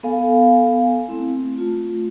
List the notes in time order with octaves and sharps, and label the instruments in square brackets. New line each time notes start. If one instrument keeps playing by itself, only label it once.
[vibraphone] B3 A4 F5 G#5
A3 C4 E4
A3 F4